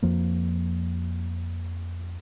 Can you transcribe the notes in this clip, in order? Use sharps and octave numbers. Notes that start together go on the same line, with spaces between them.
F2 F3 A#3